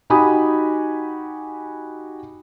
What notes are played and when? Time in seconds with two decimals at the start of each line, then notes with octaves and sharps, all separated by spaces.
0.10 D#4 F#4 G4 G#5 B5 D#6